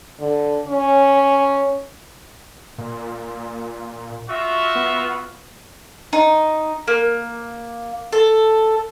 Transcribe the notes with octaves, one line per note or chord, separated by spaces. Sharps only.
D3
C#4
A#2
F4 F#4 E5
B3
D#4
A#3
A4